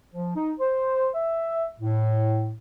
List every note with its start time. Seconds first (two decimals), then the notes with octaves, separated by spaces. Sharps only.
0.12 F3
0.36 D#4
0.60 C5
1.14 E5
1.80 A2